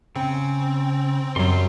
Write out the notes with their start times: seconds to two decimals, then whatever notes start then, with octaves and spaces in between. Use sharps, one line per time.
0.16 C#3 C4
1.36 F#2 F#3 G3 C6